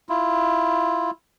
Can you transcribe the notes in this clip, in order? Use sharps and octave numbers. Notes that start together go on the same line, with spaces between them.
E4 F4